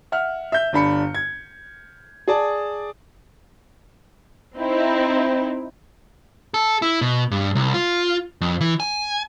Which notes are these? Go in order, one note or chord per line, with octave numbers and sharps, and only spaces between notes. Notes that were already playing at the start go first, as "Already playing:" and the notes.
E5 F#5 F6
E5 G6
G1 D4 B5 C#7
G#6
G#4 D5 A5
C4 D#4 E4
A4
E4
B2
G2
C2
F4
F2
E3
G#5